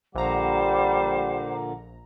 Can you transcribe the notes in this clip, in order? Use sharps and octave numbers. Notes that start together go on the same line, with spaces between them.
A#1 A#2 D3 G3 C5 F#5 A#5 D6